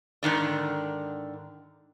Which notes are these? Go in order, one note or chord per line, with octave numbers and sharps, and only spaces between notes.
G#2 D3 D#3 D4